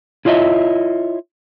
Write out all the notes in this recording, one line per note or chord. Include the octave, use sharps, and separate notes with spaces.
E4 F4 C#5 D#5 E5